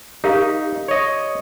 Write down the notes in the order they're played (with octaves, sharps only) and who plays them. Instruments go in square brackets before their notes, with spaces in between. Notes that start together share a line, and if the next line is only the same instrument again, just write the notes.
[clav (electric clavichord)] D#4 [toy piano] G4 A#4 F5
[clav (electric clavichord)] C#5 D#5